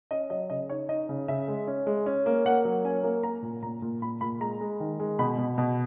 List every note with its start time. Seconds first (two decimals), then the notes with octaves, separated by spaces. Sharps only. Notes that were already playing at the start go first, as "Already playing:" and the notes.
0.11 C#4 D#5
0.30 F#3 D#5
0.50 C#3 D#5
0.70 D#4 C#5
0.89 D#4 D#5
1.09 C#3
1.28 C#3 E5
1.48 G#3
1.67 C#4
1.87 G#3
2.06 C#4
2.26 A#3
2.45 A#3 F#5
2.65 F#3
2.85 C#4 G#5
3.04 A#3
3.23 A#3 A#5
3.43 A#2
3.62 A#2 A#5
3.82 A#2
4.02 A#2 B5
4.21 A#2 B5
4.40 G#3 A#5
4.61 G#3
4.80 D#3
4.99 G#3
5.19 B2 B5
5.38 B2
5.58 B2